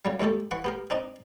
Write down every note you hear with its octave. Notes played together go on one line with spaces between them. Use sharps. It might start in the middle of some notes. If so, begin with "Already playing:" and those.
C#3 F#3 G3
D#2 G#3 A3 G4 A4
E3 F#5 C#6
B3 G4 A#4
C4 D4 D#4 D#5